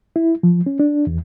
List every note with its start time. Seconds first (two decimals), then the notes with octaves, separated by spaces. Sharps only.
0.16 E4
0.43 F3
0.66 C#4
0.80 D4
1.07 E2